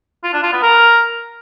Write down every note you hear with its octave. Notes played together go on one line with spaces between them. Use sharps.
F4
D4
F4
B3
A#4